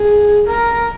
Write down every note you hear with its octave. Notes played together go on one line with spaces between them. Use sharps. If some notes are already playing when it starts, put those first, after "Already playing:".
Already playing: G#4
A#4